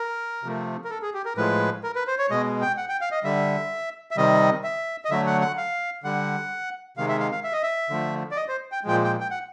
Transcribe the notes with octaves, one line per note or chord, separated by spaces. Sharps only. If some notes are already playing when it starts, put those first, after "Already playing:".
Already playing: A#4
C3 F3 A3
A#4
A4
G#4
G4
A#4
A2 F3 G#3 B4
A#4
B4
C5
C#5
B2 G#3 D#5
G5
F#5
G5
F5
D#5
D3 G3 E5
E5
C3 D#3 G3 D#5
E5
D#5
D3 F#3 A3 E5
F#5
F#5
F5
D3 G3 F#5
C3 D#3 G#3 F5
E5
F5
F5
E5
D#5
E5
D3 F3 A3
D5
D#5
C5
G5
A#2 F3 G#3 G5
G5
G5
F#5